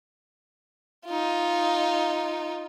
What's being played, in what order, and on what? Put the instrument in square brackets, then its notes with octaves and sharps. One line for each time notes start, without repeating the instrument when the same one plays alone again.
[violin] D#4 F4